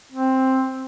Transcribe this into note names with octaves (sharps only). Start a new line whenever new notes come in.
C4